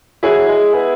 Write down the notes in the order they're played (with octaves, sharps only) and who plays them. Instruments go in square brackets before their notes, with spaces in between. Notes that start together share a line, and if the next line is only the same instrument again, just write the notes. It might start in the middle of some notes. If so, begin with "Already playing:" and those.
[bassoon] F#3 [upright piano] E4 G#4
[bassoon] G#3
B3